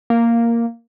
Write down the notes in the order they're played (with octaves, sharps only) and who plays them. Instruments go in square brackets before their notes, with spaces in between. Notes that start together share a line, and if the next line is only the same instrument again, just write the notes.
[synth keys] A#3